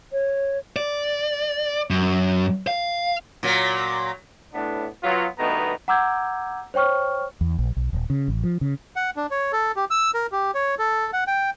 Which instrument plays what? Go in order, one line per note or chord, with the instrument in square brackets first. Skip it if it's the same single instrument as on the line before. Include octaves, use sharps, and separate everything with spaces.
[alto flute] C#5
[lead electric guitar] D5
F#2
F5
[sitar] A#2 F#3
[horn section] A2 B3 D4
F#3 B3 F4
G2 B2 D#3 A3 B3 A#5
[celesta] F#5 A#5 D6 E6 G6 G#6
C5 C#5 G5 C#6 F6
[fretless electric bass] E2
A#1
B1
D#1
C#3
A1
F3
C#3
[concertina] F#5
D4
C#5
A4
G4
E6
A#4
G4
C#5
A4
F#5
G5